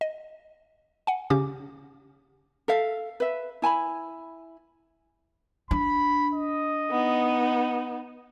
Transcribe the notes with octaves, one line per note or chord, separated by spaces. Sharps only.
D#5
F#5 G#5
C#3 C#4 G4 D6
A4 E5 F5
B4 E5
E4 G#5 A5 B5
D4 B5
D#5
B3 D#4